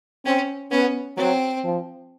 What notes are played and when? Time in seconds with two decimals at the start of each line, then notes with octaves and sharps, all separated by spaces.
0.25 C4 C#4
0.71 B3 C#4
1.16 F#3 C4
1.63 F3